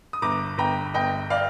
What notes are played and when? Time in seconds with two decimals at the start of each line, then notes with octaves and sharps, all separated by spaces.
0.13 D#6
0.22 G1 A#5 D6
0.58 G1 G5 A#5
0.94 G1 D#5 G5
1.30 D5 F5